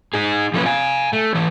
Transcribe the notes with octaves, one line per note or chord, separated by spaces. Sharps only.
D#4 G#4
F3 A3 A#3 C#4 A4 B4
F5 G#5
A3
E3 C#5